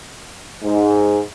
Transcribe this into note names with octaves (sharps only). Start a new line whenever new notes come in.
G#2